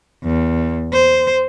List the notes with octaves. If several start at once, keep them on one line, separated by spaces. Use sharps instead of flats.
E2
C5